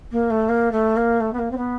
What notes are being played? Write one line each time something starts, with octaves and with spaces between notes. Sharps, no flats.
A#3
A3
A#3
A3
A#3
A3
B3
A#3
C4
B3